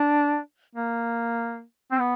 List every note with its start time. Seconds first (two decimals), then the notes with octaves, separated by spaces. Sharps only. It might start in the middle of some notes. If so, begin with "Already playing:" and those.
Already playing: D4
0.75 A#3
1.91 C4
2.00 B3